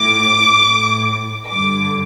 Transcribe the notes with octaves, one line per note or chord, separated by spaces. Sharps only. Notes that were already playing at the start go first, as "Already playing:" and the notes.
Already playing: A2 D6
A2
G2 D3 D6